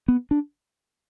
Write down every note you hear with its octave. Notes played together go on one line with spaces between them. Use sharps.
B3
D4